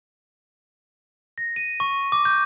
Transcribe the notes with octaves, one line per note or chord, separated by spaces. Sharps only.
A#6
D#7
C#6
D6
G6